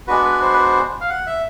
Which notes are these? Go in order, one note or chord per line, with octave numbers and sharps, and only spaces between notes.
G#3 B3 D4 F#4 B4
B4
C5
B4
C5
F5
F#5
E5